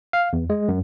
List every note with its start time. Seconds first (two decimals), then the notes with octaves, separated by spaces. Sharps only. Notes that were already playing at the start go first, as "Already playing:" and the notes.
0.13 F5
0.33 E2
0.50 G#3
0.69 F#2